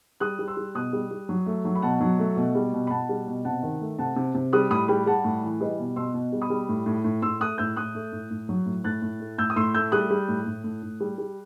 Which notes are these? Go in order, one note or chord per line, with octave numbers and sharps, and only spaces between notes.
G3 D#6 F#6
G3
C6 E6
G3
B2 D#6 F#6
G3
G3
F#3
A3
F#3
B5
B2 F#5 A5
F#3
A3
B2
G3
B2
B5
B2 F#5 A5
G3
B2
C3 F#5 A5
D#3
A3
C3 F#5 A5
C3
C3
G3 D#6 F#6
A2 B5 D#6
G3 G5 B5
G3 F#5 A5
A2
E3
G3 B4 D#5
B2
B2 C6 E6
B2
G3
B5 D#6
G3
A2
A2
A2
A2 C6 E6
A3 D#6 F#6
A2 E6 G6
A2 D#6 F#6
A3
A2
A2
F#3
A2
A2 F#6 A6
A2
A3
A2 E6 G6
D#6
A2 C6 E6
A3 E6 G6
G3 D#6 F#6
G3
A2
A2
A2
A2
G3
G3